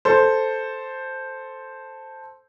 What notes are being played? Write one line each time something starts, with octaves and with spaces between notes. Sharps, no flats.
A4 C5